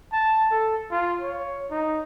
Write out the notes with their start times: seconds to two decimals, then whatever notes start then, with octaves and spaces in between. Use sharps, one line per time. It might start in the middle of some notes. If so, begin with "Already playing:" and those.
0.13 A5
0.51 A4
0.91 F4
1.21 C#5
1.71 D#4